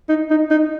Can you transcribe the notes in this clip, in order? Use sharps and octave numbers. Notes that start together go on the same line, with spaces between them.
D#4
D#4
D#4